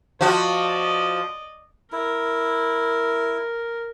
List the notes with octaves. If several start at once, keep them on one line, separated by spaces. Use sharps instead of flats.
F3 F#4 D5 D#5
E4 A#4